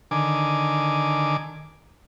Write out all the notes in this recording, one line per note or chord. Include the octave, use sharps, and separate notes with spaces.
D3 D#3 G#5 D6